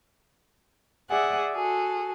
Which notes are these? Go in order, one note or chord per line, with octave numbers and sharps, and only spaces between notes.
G#4 D5 E5 F#5 G#5
F#4 G#4 A4